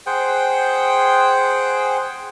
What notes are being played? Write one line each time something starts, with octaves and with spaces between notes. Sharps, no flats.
G#4 C5 F#5 G5